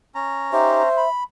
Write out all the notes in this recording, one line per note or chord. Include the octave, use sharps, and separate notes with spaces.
C#4 A#5
D#4 G4 C5 E5
B5